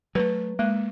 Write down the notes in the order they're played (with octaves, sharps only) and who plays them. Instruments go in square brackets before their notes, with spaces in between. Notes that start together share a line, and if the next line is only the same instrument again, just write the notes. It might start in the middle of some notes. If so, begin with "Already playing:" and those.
[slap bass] F#3 G#3 A3 [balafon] B4
[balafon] G#3 [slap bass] A#3